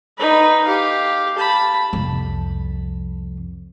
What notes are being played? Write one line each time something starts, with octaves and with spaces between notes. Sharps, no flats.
D#4 B4
G4 F5
A5 B5
C2 F2